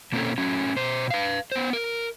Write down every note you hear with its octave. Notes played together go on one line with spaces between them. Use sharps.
B2 A#3 C4 C#4 A4
F#3 A3 C#4
B2 C5
B4 F5
B3 C5
A#4